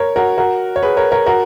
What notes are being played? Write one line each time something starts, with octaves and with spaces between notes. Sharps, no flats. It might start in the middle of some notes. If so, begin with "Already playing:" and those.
Already playing: A#4 C#5
F#4 A#4
F#4 A#4
C#5
G#4 B4
A#4 C#5
A#4 C#5
F#4 A#4